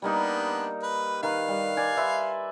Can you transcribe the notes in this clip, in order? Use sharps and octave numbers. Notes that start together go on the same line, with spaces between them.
G3 A#3 B3 D4 D#4
B4
D#3 B4 F5
G3
D5 G#5
B4 E5 C6